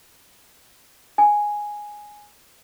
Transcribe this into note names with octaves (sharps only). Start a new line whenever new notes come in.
G#5